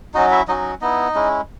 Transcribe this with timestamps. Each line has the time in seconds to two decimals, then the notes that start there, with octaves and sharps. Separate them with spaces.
0.14 F#3 C#4 D#4 F#4 D#5
0.31 E4 E5
0.48 F#3 C#4 D#4 F#4 D#5
0.81 B3 D#4 E4 D#5
1.15 G#3 C#4 E4